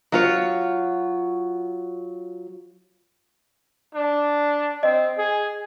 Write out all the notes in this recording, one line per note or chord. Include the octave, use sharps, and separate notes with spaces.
F#3 F4 C#5
D4
C4 D#5
G#4